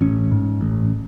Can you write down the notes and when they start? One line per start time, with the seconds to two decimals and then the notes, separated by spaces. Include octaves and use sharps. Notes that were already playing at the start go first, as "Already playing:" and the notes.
0.01 A1 C#4
0.31 G#2
0.61 A1